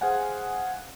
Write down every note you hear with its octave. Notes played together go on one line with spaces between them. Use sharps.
G#4 C5 F5 F#5 G#5